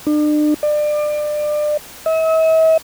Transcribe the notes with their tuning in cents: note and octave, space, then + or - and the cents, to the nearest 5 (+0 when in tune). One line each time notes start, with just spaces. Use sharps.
D4 +40
D5 +30
E5 -45